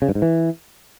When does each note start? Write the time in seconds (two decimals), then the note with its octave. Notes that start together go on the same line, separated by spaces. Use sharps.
0.02 C#3
0.09 G2
0.15 G#2
0.22 E3